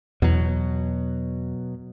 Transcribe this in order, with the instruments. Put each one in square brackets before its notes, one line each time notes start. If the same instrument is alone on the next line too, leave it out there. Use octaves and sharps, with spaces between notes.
[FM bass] E2 [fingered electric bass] B2 F#3